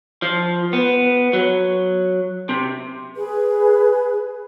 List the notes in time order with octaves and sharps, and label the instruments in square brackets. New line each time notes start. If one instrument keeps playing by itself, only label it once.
[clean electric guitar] F3
B3
F#3
C3
[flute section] G#4 B4